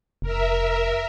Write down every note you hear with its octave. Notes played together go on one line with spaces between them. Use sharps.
F1 A#4 E5